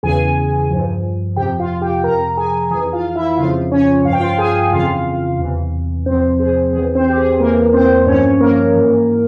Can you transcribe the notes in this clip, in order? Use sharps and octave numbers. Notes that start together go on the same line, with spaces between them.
E2 C#3 E3 G#4 G#5
G2 F3
F2 C3 F3 G4 G5
F4 F5
G4 G5
F2 C3 F3 A#4 A#5
G#4 G#5
F2 E3 G#4 G#5
F4 F5
E4 E5
F2 C#3 F3 F4 F5
C#4 C#5
G2 F3 F5
G5
F4 F5
G#4 G#5
F2 C#3 E3 F4 F5
E2 C3 E3
E2 C3 F3 C4 C5
G#4
E2 E3 G#4
C4 C5
G4
G#4
E2 E3 A#3 A#4
C4 C5
G2 F3 C#4 C#5
A#3 A#4
G#2 E3